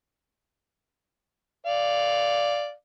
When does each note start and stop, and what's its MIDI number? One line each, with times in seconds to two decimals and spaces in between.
1.66 2.72 74
1.66 2.72 77